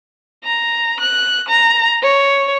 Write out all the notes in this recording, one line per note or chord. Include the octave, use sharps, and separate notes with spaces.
A#5
F#6
A#5
C#5